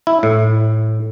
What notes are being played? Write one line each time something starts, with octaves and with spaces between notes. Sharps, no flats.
E4
A2